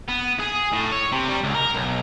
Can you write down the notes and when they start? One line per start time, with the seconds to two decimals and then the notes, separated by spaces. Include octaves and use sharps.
0.09 B3
0.40 G#4
0.73 A2
0.92 C#5
1.12 C3
1.28 G3
1.43 C#2
1.55 A#4
1.75 B1